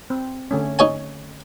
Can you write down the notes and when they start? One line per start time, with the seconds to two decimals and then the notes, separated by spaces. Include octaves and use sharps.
0.10 C4
0.51 D3 A3 C#4
0.79 D#4 C#5 G#5